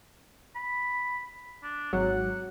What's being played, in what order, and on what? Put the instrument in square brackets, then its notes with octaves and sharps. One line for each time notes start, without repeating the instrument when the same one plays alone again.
[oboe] B5
D4
[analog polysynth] G#1 F#3 [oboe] F#5